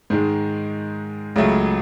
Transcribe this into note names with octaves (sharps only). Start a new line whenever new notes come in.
G#2 D#3 G#3
C#2 C#3 F#3 A3